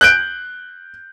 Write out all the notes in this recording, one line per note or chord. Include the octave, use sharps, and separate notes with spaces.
F#6 G6 D7